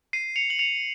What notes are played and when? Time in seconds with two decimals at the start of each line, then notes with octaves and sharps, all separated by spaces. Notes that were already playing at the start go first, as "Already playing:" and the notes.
0.13 C7 D#7
0.36 C#7 F7
0.50 F#7
0.59 C#7 F7